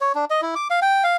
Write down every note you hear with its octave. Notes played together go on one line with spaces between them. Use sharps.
C#5
D4
D#5
E4
D6
F5
G5
F5